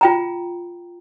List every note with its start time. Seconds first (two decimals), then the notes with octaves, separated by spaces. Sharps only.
0.01 F4 G5 A#5